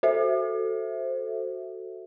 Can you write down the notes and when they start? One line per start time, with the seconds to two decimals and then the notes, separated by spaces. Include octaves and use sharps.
0.03 F#4 A4 C5 E5